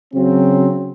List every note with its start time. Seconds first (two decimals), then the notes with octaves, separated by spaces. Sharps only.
0.13 C#3 F#3 C4